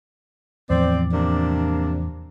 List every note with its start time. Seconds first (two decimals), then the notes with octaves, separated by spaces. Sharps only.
0.70 E2 A2 F3 C4 D5
1.13 C3 A#3 D4